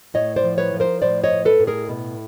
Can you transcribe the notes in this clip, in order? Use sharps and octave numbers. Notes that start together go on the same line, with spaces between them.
A2 C#5 D#5
C5 D5
F3
B4 C#5
F3
A#4 C5
A2 C5 D5
C#5 D#5
A2
A4 B4
A2
G#4 A#4
B2